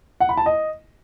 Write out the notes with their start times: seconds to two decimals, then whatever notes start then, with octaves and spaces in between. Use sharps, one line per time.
0.20 F#5
0.29 B5
0.37 A5
0.46 D#5